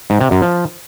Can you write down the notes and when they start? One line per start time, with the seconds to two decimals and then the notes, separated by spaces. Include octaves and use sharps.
0.10 G#2
0.21 C3
0.31 F#2
0.42 F3